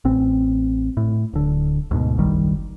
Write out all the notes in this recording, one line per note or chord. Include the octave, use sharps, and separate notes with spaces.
A1 C4
A2
D1 D3
D2 G#2 B2
F#1 B1 D#3 G3